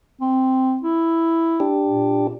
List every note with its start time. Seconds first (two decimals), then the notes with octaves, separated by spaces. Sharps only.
0.21 C4
0.83 E4
1.60 D4 G4
1.86 A#2